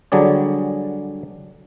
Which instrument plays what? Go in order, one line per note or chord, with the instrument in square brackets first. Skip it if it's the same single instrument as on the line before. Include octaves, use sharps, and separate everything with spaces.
[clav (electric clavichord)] D3 F#3 G3 G#4 D5